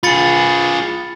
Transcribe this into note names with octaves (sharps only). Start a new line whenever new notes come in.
F4 G#4 B5 A6 C#7